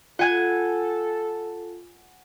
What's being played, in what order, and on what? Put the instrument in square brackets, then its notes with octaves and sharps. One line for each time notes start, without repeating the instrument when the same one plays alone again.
[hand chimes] F4 [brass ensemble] A4 [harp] F#5 G#5 G#6